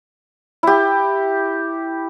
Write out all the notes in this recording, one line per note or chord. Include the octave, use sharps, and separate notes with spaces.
E4 G4